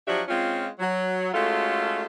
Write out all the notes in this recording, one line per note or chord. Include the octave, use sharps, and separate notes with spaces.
F3 F#3 D4 F#4 G4 E5
G#3 C4 C#4 F4
F#3
G#3 A3 C#4 F4 F#4 A4